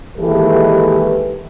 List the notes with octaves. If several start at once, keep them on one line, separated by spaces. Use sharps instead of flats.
D#2 E3 G#3 G4 A4 B4